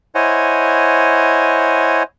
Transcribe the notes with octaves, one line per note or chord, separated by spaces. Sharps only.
E4 C5 C#5 D#5 F#5 G#5